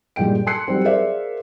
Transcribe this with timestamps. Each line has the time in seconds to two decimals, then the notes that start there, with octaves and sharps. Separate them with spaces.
0.16 G2 A#2 G#3 G5 D7
0.46 A5 C6 E6 F#6 C7 C#7
0.68 F#3 G3 C4
0.84 G#4 A#4 C5 D5 E5 F5